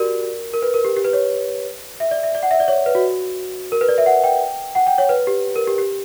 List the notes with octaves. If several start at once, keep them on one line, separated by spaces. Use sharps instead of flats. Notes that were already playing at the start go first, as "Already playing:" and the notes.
Already playing: F#4 G4 A#4 D5
A#4
B4
A#4
G4
G4
B4
C#5
E5
D5
E5
D5
F#5
E5
D5
C#5
B4
F#4
A#4
B4
D5
E5
F#5
G5
F#5
G5
C#5
B4
G4
A#4
G4
G4